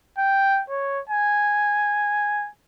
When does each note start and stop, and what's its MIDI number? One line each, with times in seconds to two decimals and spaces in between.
0.19 0.62 79
0.70 1.01 73
1.09 2.50 80